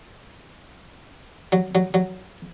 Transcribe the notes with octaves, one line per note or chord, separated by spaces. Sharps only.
F#3
F#3
F#3